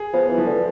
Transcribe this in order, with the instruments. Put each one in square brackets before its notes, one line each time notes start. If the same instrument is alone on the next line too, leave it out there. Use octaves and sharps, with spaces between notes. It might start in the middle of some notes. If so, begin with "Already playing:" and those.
Already playing: [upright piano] G#4
[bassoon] F3 [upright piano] B3
[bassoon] E3
[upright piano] F3
[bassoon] D3